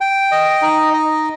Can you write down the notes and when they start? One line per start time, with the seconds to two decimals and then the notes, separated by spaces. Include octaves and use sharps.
0.01 G5
0.32 D#5
0.62 D#4
0.93 D#5